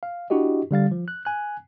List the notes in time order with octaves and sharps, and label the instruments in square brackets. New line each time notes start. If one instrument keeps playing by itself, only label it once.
[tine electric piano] F5
D4 E4 F#4 G4 D#5
D3 G3 F5 A6
F3
F#6
G#5 F#6